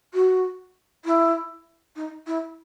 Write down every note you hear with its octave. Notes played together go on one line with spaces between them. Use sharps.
F#4
E4
D#4
E4